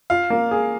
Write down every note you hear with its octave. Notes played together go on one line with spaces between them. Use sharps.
F4 F5
A#3
G#4